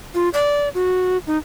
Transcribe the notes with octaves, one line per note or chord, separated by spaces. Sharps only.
F4
D5
F#4
D#4